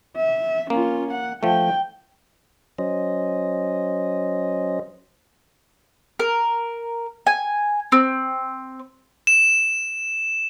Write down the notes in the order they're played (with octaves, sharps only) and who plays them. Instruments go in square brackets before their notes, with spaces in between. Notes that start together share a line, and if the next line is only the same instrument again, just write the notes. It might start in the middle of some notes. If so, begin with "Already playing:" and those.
[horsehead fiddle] E5
[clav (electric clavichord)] A#3 [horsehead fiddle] C#4 F4
[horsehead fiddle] F#5
[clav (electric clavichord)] F3 A3 [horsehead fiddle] G5
[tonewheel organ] F#3 C#4 C5 D#5
[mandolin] A#4
G#5
C4
[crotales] E7